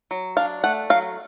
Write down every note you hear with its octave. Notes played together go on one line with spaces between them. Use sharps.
F#3
D4 F5
A3 F#5
F#3 F5